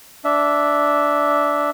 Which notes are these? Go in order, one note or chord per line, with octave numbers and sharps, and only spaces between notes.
D4 E5